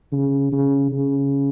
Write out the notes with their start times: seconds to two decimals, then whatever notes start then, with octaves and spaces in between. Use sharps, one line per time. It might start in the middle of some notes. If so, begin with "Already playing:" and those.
0.12 C#3
0.52 C#3
0.92 C#3